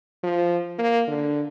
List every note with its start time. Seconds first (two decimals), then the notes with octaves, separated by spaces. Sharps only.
0.23 F3
0.79 A#3
1.08 D3